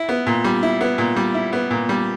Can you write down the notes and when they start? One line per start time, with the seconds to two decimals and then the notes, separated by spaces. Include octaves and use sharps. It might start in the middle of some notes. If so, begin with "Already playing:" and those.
Already playing: E4
0.09 B3
0.27 A#2
0.44 G3
0.63 E4
0.81 B3
0.98 A#2
1.16 G3
1.34 E4
1.53 B3
1.71 A#2
1.89 G3